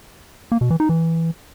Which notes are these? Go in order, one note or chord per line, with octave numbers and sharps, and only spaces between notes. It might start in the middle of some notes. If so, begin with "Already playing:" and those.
A#3
B2
E3
D#4
E3